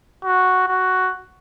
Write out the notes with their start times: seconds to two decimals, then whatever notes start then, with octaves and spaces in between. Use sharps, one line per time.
0.24 F#4
0.68 F#4